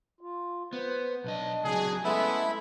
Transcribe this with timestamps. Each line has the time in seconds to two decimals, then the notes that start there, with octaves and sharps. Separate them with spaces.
0.21 F4
0.73 B3 C5
1.24 B1 D4 D#5
1.64 C#2 F#3 G#4
2.04 G#3 A3 B3 C#4 E4 A4 E5 B5